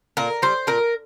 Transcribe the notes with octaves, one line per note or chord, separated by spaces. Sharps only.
A#2 A#4
G3 C5
A#2 A#4